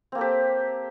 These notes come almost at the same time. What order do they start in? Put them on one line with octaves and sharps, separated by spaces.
C4 A#3 A4 G4